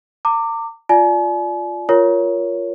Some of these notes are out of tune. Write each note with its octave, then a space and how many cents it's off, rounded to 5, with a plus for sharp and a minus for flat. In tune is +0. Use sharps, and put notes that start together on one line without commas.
A#5 -40 D6 +5
F4 +0 D5 +0 G#5 +45
F4 +0 A#4 +0 C#5 +10